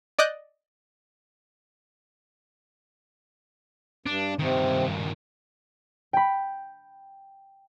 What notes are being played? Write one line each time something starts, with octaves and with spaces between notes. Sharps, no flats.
D5 D#5 F#6 G6
G2 D4
G2 C3 D#3
G5 B5